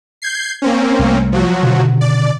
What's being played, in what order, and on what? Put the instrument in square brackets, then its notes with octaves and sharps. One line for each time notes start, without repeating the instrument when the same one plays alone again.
[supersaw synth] G6 G#6 C7
A#3 C4 C#4
[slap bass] C2 A3
[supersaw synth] F3 F#3 F#4
[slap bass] B2 D3 D#3
[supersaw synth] D5